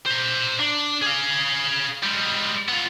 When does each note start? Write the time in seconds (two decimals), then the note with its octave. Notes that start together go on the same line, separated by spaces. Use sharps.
0.06 C5 A#5
0.59 D4
1.02 G#4 F5
2.03 G3 G#3
2.69 B3 F4